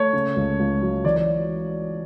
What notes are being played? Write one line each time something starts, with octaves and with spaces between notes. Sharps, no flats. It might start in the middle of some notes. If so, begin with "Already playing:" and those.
Already playing: A3 C#5
C#3
C#2
C#2
F#3
E3 D5
D5